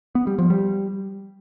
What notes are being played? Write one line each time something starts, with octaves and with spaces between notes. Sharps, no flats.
B3
G3
F3
G3